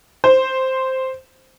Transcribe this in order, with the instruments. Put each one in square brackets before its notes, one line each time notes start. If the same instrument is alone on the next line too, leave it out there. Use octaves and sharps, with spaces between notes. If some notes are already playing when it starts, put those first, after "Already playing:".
[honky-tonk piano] C5